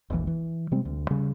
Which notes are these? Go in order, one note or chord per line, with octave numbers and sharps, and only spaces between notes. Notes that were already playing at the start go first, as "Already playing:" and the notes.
E1 A#1 A#2 E3
E3
C3 G3 G#3 C4
D2
C#3 G3